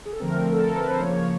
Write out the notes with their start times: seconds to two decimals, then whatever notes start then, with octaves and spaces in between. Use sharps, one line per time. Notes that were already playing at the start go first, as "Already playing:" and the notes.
0.05 G#4
0.12 A4
0.20 D3 F3 A3 C4 A#4
0.52 A4
0.64 A#4
0.77 B4
0.88 C5
1.00 C#3 F3 A#3 C#5